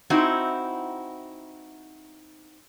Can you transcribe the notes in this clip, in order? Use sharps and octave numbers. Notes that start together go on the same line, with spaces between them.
C4 D#4 E4 F#4